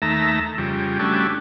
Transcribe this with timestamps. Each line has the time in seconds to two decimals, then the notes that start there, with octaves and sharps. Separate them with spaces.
0.02 D#2 A3 E5 A#5
0.58 F2 C#3 G3
0.99 G3 A3 C#4 D4 E4 F#4